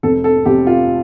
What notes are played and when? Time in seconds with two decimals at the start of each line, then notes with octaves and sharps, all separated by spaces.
0.03 F1 A4
0.24 A4
0.45 F1 G4
0.67 F4